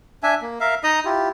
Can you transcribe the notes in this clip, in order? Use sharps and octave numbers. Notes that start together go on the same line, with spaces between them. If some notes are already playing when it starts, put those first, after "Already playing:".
D4 E5 G#5
A#3
A#4 E5 F5
D#4 D#5 A#5 D#6
E4 F4 G4